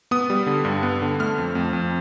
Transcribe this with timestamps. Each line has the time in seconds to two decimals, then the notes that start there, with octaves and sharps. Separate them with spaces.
0.11 B3 D#6
0.30 G3
0.47 D3
0.65 G2
0.83 B3
1.02 D3
1.20 A3 F6
1.38 F2
1.55 F2
1.73 F2